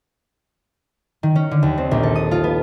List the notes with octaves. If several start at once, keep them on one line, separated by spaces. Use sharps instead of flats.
D#3
C#4
D3
D#2
C4
A#1
A4
D#6
F4
B3